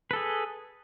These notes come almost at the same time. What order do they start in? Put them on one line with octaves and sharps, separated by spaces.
B4 A4 G#4